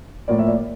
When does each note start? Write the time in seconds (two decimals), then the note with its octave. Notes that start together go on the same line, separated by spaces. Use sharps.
0.28 A2 F3 A#3 D5
0.39 E5
0.48 D5